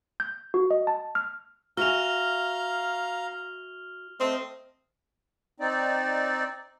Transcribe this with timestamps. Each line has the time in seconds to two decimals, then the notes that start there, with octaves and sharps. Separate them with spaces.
0.20 G6
0.54 F#4
0.71 D#5
0.87 A5
1.15 F6
1.77 F#4 E5 F5 G#5 A#5 F6 F7
4.20 A3 C4 D#5 D#6
5.60 C4 D#4 D5